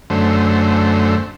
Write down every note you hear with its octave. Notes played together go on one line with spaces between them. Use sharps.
F#2 D3 A3 C5